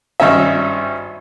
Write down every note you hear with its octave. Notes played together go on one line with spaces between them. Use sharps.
G#1 G2 C#4 D#5 E5